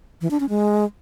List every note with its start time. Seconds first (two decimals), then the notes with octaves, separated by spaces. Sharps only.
0.21 E3
0.31 D4
0.40 C#4
0.49 G#3